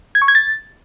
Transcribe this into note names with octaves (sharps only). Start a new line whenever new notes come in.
G#6
C#6
G#6
A6